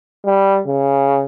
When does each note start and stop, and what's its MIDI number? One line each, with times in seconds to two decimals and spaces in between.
0.26 0.60 55
0.67 1.26 49